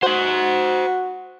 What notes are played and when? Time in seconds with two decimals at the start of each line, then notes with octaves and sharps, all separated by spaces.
0.03 F#4 C5 F#5